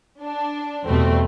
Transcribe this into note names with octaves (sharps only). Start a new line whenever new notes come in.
D4
E2 B2 G3 A3 C4